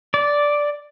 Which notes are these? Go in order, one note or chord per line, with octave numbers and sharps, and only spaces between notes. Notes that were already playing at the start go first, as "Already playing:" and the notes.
D5